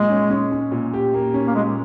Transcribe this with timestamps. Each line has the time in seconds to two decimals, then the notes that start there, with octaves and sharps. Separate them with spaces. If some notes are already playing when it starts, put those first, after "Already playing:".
Already playing: A#2 G#3
0.10 C#4
0.30 C#4
0.52 C#4
0.72 A#2
0.94 G4
1.14 A#3
1.34 C#4
1.47 A#3
1.55 A#2 G#3